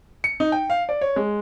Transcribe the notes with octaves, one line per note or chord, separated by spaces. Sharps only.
C#7
D#4
G5
F5
D5
C#5
G#3